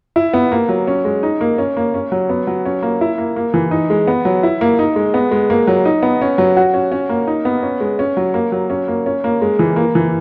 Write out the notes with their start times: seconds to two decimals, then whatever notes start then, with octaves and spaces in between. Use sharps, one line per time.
0.16 E4
0.33 B3
0.52 A#3
0.69 F#3
0.87 C#4
1.05 G#3
1.23 D#4
1.41 A#3
1.58 C#4
1.77 A#3
1.94 C#4
2.12 F#3
2.29 B3
2.47 F#3
2.65 C#4
2.83 A#3
3.01 E4
3.18 A#3
3.36 A#3
3.54 E3
3.71 D#4
3.90 G#3
4.07 B3
4.25 F#3
4.43 E4
4.61 A#3
4.79 D#4
4.96 G#3
5.14 B3
5.31 G#3
5.50 A#3
5.67 F#3
5.85 D#4
6.03 B3
6.22 C#4
6.38 F#3
6.57 F#4
6.74 C#4
6.92 C#4
7.09 A#3
7.27 D#4
7.45 B3
7.63 C#4
7.80 G#3
7.99 C#4
8.17 F#3
8.34 A#3
8.52 F#3
8.70 C#4
8.88 A#3
9.06 C#4
9.24 A#3
9.42 G#3
9.59 E3
9.76 A#3
9.95 E3